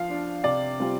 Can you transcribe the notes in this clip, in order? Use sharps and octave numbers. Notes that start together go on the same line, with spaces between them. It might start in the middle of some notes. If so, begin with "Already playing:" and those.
Already playing: F3 F5
D4 F4
C3 D5
G3 C4 F4